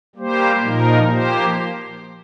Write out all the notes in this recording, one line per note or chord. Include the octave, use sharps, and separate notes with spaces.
G3 A#3 G4 C5
A#2 F3 D#4 A#4
F3 A#3 G4 C5